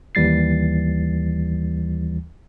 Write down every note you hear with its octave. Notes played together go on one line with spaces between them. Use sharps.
D#2 E3 G3 A6 C7